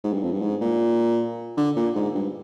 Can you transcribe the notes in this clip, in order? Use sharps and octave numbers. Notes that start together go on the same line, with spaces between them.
G#2
G2
F2
G2
G#2
A#2
D3
A#2
G#2
G2